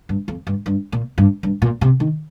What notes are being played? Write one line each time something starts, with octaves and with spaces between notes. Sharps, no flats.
G2
F2
G2
G2
A#2
G2
G2
A#2
C3
D#3